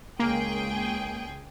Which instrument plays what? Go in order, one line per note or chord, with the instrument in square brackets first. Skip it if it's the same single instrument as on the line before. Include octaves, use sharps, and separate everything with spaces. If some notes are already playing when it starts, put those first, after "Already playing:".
[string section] C#2 G#4 G5 [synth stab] A#3